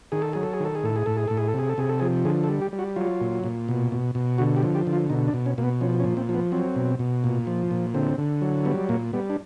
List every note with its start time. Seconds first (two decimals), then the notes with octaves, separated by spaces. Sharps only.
0.12 D#3 G#4
0.22 A4
0.33 F#3 G#4
0.43 A4
0.53 G#4
0.60 D#3
0.65 A4
0.75 G#4
0.84 A2 A4
0.96 G#4
1.06 A2 A4
1.17 G#4
1.28 A2 A4
1.37 G#4
1.48 A4
1.54 C3 G#4
1.69 A4
1.78 C3 G#4
1.89 A4
2.00 F3 G#4
2.25 D3 G#4
2.44 A4
2.49 G3
2.62 G4
2.72 G3
2.79 F#4
2.96 F#3 F4
3.21 A#2
3.44 A#2
3.68 B2
3.92 B2
4.15 B2
4.38 D3 F#4
4.56 G4
4.63 F3
4.75 G4
4.87 D3
4.93 F4
5.10 B2 D#4
5.28 D4
5.34 B2
5.46 C#4
5.58 B2 A#3
5.64 B3
5.81 F3 C#4
6.00 C#4
6.04 A#2
6.17 C4
6.29 F3
6.34 B3
6.52 F#3 C4
6.76 B2
6.99 B2
7.24 A#2
7.47 F3
7.71 A#2
7.94 D3 C4
8.18 D3
8.41 F#3
8.65 G3 B3
8.89 A#2 A#3
9.13 G3 B3
9.30 D4